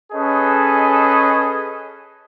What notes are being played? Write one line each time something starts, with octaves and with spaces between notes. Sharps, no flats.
C#4 G#4 A4 B4 D#5